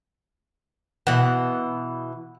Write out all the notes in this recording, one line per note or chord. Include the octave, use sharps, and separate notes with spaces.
B2 E3 F#5